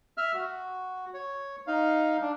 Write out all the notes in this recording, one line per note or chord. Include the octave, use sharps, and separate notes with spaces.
E5 F6
F#4
C#5
D#4 F5
D4